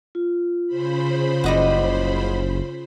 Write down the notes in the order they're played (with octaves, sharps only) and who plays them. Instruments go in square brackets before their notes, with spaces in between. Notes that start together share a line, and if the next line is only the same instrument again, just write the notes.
[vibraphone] F4
[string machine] C#3 C5 B5
[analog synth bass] F#1 [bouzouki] G3 D#5 F#5